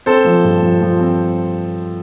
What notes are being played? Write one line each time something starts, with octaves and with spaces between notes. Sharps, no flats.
C4 A4 C5
F3
G2
F3
F3
C4